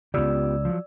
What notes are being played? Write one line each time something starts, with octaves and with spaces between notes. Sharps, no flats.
C#2 C#3 B3 F4 G4 D5 E6
F3 F#3